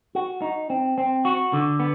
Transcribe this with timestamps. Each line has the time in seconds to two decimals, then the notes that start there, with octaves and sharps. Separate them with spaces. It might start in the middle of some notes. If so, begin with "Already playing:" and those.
0.15 F#4
0.42 D#4
0.70 C4
0.98 C4
1.25 F#4
1.53 D3
1.80 B3